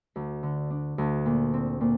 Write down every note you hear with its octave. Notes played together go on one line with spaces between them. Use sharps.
D2
D3
D4
D2
A#2
C4
A#2